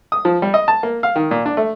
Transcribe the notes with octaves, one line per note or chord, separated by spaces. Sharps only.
D#6
F3
G3
D#5
A5
A#3
F5
D#3
A#2
D4
A3